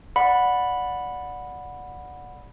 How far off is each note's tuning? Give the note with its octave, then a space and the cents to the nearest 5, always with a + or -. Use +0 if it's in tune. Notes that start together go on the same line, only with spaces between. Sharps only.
D5 +0 F#5 -15 B5 +0